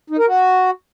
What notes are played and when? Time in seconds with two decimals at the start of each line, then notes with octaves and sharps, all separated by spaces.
0.10 D#4
0.18 A#4
0.27 F#4